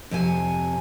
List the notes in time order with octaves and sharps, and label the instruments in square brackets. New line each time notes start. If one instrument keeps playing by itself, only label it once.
[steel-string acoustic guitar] F2 C3 G#5